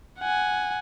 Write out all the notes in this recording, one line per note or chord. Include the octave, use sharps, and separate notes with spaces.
F#5 G#5